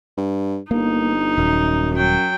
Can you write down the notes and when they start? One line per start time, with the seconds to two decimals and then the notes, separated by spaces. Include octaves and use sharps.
0.17 G2
0.71 G1 A#3 D#4
1.38 D#1 F#2
1.95 F#3 G5